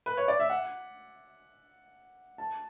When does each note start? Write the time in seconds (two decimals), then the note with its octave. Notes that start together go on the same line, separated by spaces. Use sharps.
0.06 B4
0.17 C#5
0.28 D5
0.40 E5
0.50 F#5
2.38 A5